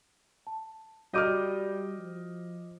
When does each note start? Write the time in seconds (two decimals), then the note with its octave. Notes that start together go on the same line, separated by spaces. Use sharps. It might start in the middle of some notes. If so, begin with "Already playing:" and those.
0.47 A5
1.14 G3 F#4 D#5 D6 F6 G6 D#7
1.99 F3